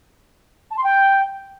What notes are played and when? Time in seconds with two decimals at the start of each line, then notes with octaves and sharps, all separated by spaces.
0.70 A5
0.77 C6
0.83 G5